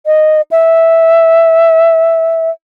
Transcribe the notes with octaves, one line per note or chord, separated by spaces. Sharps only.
D#5
E5